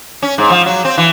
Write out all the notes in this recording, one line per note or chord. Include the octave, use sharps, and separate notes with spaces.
C#4
G#2
F3
F#3
C4
E3